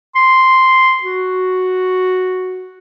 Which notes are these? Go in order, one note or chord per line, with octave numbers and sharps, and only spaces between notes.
C6
F#4